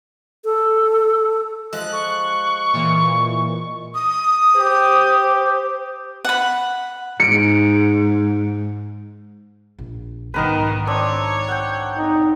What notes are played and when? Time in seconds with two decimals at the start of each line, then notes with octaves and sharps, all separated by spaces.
0.45 A4
1.73 F3 G#3 F#6
1.93 C#6
2.73 A#2 E3
3.94 D#6
4.56 G4 C5
6.25 F#5 B5
7.20 G#2 C#7 D7
9.78 A#1
10.34 B1 G#2 D#3 B3 A#4 B4
10.87 C4 D4 C#5
11.48 F#5 G5
11.96 G#1 D#4